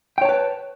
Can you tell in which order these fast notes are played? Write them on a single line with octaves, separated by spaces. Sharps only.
G5 C#5 A5 B4